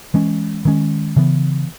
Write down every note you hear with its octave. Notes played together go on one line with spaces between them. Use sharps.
E3 G#3 C#4
D#3 G#3 C#4
C#3 E3 B3